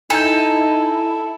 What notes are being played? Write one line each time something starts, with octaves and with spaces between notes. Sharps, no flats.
D#4 E4 A4 G#5 A#5 G6